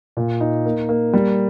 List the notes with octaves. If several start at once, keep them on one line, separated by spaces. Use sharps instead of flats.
A#2
D#4
A#3
A#3
G3